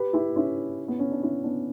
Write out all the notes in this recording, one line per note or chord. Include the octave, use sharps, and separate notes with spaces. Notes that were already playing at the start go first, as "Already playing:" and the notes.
Already playing: G4 B4
E4 G4
C#4 E4
B3
C#4
D4
C#4 E4
B3 D4